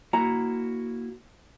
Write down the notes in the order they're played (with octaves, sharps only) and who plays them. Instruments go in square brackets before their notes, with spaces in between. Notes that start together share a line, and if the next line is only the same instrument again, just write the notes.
[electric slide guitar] A#3 E4 F#4 [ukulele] A#5